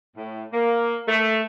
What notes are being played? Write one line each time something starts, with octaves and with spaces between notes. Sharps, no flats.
A2
A#3
A3